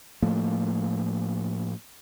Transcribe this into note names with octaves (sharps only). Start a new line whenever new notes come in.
A2 F3 A3 A#3